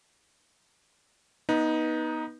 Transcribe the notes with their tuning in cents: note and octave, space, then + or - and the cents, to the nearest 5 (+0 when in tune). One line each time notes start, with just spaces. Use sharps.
B3 -15 D#4 +10 B4 -20